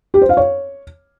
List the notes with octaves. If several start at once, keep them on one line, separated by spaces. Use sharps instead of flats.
G4
C5
F5
C#5